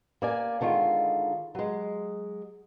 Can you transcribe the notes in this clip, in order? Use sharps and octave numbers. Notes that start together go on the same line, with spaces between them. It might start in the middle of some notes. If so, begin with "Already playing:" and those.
A#3 D5 G#5
D3 D#3 G#3 F4
F#3 G#3